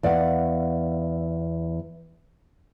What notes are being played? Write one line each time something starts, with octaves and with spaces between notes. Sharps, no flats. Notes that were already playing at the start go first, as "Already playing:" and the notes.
E2 D5 F5 F#5